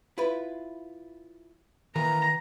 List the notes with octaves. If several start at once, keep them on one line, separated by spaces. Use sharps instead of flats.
E4 F4 B4
D#3 E3 A#3 A#4 B4 A#5